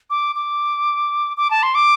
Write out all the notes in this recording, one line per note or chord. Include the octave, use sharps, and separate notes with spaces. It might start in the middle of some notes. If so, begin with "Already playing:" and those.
D6
D6
D6
A5
C6
D6